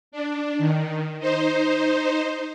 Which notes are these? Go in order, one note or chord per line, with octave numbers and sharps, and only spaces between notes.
D4
D#3
D#4 C5